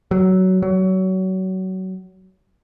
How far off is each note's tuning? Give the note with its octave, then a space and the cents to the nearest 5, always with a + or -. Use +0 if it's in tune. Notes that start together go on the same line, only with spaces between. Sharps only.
F#3 +15
F#3 +25